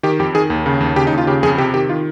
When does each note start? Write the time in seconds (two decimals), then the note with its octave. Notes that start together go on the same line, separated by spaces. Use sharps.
0.03 D#3 G4
0.19 F2 G4
0.35 D#3 G#4
0.50 D#2
0.66 C#3
0.81 D#2
0.96 C#3 G4
1.07 D#4
1.12 D#2
1.18 F4
1.27 C#3 G4
1.43 F2 G#4
1.58 C3 G4
1.74 D#3 G4
1.89 D#3 F4